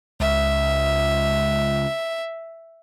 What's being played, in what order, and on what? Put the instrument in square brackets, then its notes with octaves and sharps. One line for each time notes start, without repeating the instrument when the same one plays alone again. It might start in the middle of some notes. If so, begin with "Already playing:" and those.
[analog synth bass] C#2 [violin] E5